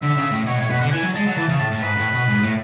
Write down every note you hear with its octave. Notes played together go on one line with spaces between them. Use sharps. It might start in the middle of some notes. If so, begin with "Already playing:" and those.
D3 E5
C#3
A2
B2 C#5
A2
C#5
B2 B4
D3 F#5
E3 G#5
F#3
G#3 A5
F#3
E3 A5
C#3
A2 A5
A2
G#2 B4
A2
B2
G#2
A2